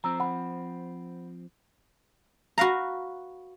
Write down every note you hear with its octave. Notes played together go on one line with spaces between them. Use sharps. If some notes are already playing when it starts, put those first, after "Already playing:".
F3 C4 A#5 E6
F#5 B5
F#4 B4 F5 A#5